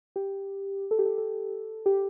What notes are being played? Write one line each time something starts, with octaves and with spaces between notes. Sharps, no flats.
G4
A4
G4
A4
A4
G4